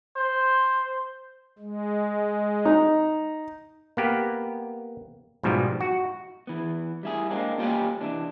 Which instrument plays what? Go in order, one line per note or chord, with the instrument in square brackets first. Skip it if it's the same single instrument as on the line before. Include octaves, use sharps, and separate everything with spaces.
[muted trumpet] C5
[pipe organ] G#3
[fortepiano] D#4
[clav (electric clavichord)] A#3 B3 G4
G#2 B2 F3 G3
F#4
[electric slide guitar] E3 B3
G3 E4 G#4
G#3 A#3 C4 D4
A#3 F4 G4 C#5 G5 G#5
C3 E3 D4